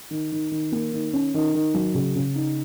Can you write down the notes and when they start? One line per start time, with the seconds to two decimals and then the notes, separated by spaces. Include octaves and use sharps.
0.11 D#3
0.32 D#3
0.51 D#3
0.72 A#3
0.93 D#3
1.13 C#4
1.34 D#3
1.55 D#3
1.74 F#3
1.95 C#3
2.15 C#3
2.35 D#4